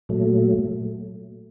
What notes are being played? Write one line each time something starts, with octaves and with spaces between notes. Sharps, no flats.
A#2 F#3 A3